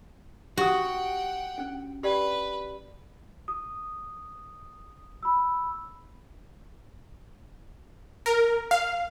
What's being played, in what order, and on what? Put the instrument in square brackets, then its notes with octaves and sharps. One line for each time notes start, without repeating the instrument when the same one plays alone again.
[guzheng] F#4 [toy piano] G4 D#6 [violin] F#5 G5
[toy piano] C#4 D4
[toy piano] G4 D5 G5 [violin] B4
[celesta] D#6
B5 E6
[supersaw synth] A#4
F5